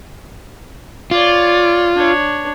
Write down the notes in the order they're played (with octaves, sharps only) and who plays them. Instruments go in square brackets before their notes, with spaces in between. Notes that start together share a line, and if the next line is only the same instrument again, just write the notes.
[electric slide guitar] F4 [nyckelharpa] C#5 D5
[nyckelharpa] D4 C#5